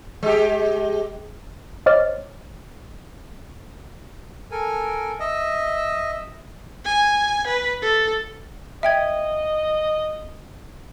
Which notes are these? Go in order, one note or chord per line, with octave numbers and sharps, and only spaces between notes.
G#3 G4
C5 C#5 D#5 D6 F6 A6
A4 A#4 G#5
D#5 E5
G#5
B4
A4
D#5 E5 G5 G#6